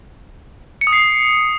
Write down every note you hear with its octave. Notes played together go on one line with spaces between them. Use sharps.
C#7
D#6
C7